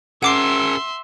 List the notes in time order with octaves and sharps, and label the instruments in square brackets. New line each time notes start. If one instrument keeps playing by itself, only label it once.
[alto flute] C#4 [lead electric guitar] G#4 A#4 [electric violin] E5 C6 [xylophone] F#5 D6 C7